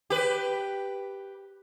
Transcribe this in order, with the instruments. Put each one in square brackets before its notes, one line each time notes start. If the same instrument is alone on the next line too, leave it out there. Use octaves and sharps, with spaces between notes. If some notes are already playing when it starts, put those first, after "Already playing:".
[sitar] G4 B4